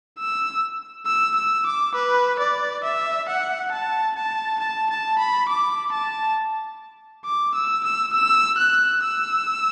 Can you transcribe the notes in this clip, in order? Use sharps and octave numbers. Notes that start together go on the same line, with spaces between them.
E6
E6
E6
D6
B4
D5
E5
F#5
A5
A5
A5
A5
B5
D6
A5
D6
E6
E6
E6
F#6
E6